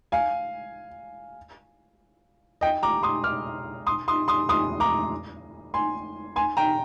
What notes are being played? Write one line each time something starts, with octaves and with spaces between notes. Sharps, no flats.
F5 G#5
D#5 G5
A#5 D6
C6 D#6
D6 F6
C6 D#6
C6 D#6
C6 D#6
C6 D#6
A#5 D6
G#5 C6
G#5 C6
G5 A#5